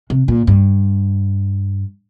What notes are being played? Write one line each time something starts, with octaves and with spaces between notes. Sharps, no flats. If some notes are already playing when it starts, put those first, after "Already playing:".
C3
A#2
G2